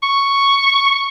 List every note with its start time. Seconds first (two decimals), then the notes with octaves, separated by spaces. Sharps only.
0.03 C#6